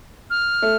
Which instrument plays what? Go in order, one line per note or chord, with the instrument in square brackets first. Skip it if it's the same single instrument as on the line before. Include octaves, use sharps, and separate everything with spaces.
[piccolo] F6
[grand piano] A3